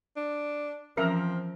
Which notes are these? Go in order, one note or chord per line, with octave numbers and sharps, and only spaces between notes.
D4
E3 F3 C4 C#4 A#4 E5 A#5 E6